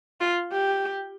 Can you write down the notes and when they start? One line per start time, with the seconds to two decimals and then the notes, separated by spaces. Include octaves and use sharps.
0.21 F4
0.52 G4